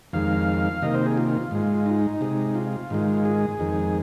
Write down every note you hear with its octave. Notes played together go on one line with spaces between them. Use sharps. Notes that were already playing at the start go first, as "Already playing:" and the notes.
F2 D#3 G#3 F5
C3 D#3 A#3 D#5
C5
G#4
F4
G#2 G#3
D#4
C3 G#3
F4
G#2 D#3 G#3
G#4
F2 D#3 G#3